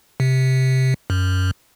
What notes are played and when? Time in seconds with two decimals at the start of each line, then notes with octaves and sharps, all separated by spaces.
0.20 C3
1.10 F#2